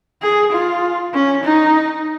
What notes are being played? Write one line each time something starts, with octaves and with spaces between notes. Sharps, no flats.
G#4
F4
C#4
D#4